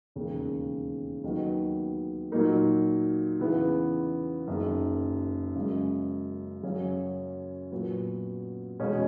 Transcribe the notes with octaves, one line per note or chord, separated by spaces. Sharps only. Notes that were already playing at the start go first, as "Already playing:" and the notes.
E1 D#2 C#3
D#2 D#3 F#3 B3
A#2 F#3 A#3 D#4 A#4
E2 C#3 E3 B3
F#1 F#2 D#3
F#2 C#3 G#3
F#2 C#3 F#3 C#4
A#2 F#3 B3
E2 B2 G#3 C#4